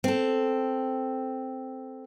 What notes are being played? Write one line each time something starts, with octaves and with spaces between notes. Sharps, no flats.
C4 A4